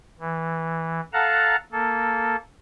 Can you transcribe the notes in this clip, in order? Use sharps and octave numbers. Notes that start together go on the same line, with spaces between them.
E3
A4 F5 F#5 A5 A#5
A#3 A4